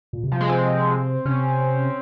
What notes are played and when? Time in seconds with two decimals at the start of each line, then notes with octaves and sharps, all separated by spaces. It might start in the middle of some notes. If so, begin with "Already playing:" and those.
0.13 A#2
0.24 C3
0.32 F3
0.41 G#3
0.49 C4
1.25 C3 C#4